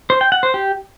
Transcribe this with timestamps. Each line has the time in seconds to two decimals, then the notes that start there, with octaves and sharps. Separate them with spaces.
0.10 C5
0.21 G5
0.32 F#5
0.43 C5
0.54 G4